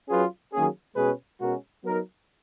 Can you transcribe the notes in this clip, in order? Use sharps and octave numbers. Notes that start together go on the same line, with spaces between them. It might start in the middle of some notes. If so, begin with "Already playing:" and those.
F#3 C#4 F4 G#4 B4
D#3 F#3 A#3 C#4 G#4
B2 G#3 C#4 G#4 B4
B2 G#3 C#4 F#4 A#4
F#3 B3 D#4 A#4